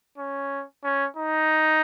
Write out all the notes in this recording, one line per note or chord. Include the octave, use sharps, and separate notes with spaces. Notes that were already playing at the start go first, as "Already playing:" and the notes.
C#4
C#4
D#4